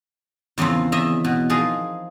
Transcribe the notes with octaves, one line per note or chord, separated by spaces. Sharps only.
E2 C#3 F3 A#3 C4
E2 D#5 E5
B2
F3 D#4 G#4 A#4